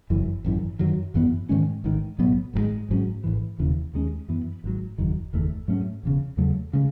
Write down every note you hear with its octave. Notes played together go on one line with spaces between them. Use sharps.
F#1 F#2 E3
G#1 F#2 E3
F#2 D#3 F#3
G#1 F#2 E3 B3
G#2 D#3 G#3 C#4
A1 G#2 D#3
B1 A2 F#3 B3
G#1 G#2 D#3 G#3
G#1 G#2 F#3 C#4
A1 G#2 E3
E1 D#2 C#3 E3
D#2 D#3 G#3 C#4
F#2 E3 B3
G#1 G#2 F#3
F#1 E2 D#3 F#3
F#1 E2 D#3 A3
G#2 F#3 A3 C#4
E1 E2 C#3
E2 C#3 F#3 A3
C#3 G#3